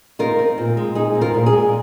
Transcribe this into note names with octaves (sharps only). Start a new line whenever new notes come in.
D#4 F4 A#4
C4
A#2
G#3
D#4 G#4
C4
F4 A#4
A#2
G#4
G#3